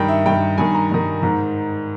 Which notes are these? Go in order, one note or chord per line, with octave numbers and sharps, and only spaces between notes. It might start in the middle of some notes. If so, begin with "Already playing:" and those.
Already playing: G2 D#3 G5
E5
G2 D#3 G5
G2 D#3 G#5
A#5
G2 D#3
G#2 D#3